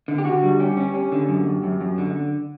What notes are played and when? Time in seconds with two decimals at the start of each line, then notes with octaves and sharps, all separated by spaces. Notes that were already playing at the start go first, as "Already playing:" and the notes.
0.08 D3
0.18 G4
0.25 D3 F#4
0.43 G3
0.60 C#4 G4
0.77 C#4
0.94 C#4
1.12 D3
1.28 F#2
1.46 F#2
1.63 F#2
1.80 F#2
1.98 D3